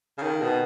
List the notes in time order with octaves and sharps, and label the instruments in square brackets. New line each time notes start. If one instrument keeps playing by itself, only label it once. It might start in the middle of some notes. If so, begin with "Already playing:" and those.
[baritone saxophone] C#3
D#3
B2